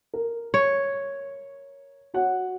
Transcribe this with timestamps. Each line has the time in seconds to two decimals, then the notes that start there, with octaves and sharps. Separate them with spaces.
0.14 A#4
0.54 C#5
2.14 F#4 C#5 F#5